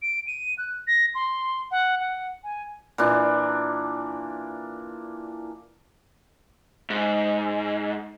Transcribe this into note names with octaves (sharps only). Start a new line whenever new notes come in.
D7
D#7
F#6
A#6
C6
F#5
F#5
G#5
A#2 E3 D4
G#2